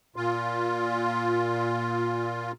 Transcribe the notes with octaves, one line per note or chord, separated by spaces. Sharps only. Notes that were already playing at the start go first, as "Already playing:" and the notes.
A#2 F4